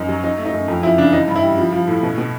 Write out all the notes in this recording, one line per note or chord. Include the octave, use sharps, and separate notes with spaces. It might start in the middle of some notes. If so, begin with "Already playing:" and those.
Already playing: F#2 D#4
F#3
F#3 D#4
A3
D#4
F#2
F2
F3 E4
C#3 D4
E3 D#4
G2
E4
G3
F3
F3
A2
B2
B2